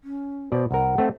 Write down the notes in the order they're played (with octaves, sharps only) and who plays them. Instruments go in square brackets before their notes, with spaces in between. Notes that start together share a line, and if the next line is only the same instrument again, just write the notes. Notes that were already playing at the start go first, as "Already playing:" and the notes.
[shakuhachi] C#4
[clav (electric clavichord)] B2 D5 [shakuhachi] C5
[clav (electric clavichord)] C2 A#4 [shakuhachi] F#5
[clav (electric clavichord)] A3 C4